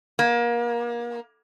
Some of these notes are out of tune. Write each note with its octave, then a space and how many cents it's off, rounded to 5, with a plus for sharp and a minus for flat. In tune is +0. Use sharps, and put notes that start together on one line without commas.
A#3 +30